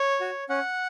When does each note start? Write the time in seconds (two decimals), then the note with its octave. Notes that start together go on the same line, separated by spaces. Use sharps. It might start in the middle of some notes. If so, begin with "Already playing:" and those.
Already playing: C#5
0.20 F#4
0.49 C#4 F#5